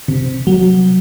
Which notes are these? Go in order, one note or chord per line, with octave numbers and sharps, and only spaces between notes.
C3
F#3